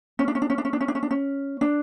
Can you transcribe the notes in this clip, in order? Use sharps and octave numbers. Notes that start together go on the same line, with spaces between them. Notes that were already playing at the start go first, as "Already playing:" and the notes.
C#4
D4
C#4
D4
C#4
D4
C#4
D4
C#4
D4
C#4
D4
C#4
D4